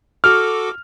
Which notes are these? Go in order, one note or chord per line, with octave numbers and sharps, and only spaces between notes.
F#4 A4 D6 F6